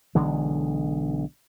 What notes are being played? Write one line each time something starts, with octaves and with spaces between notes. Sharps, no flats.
B1 D3 E3 G#3